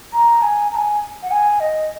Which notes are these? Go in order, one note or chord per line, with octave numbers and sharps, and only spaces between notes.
A#5
G#5
A#5
G#5
F#5
G#5
D#5